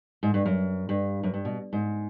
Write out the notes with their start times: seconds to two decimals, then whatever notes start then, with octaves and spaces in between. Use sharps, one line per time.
0.23 G#2
0.34 G2
0.46 F#2
0.89 G2
1.23 F#2
1.34 G2
1.45 B2
1.73 G#2